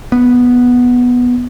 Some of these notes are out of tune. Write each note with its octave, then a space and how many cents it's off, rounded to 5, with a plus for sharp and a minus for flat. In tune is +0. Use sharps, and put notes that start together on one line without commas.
B3 -5